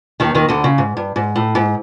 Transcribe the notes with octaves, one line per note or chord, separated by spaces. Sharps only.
D#2 D#3
D#2 D#3
D2 D3
C#3
G#2
G2
G#2
A2
G#2